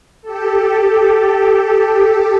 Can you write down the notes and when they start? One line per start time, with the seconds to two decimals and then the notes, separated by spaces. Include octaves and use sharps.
0.22 G4 A4